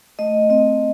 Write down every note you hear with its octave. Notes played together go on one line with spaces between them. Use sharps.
A3 D#5
C4 D#5